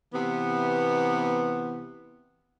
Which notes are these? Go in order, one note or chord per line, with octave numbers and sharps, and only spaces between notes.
C3 E3 B3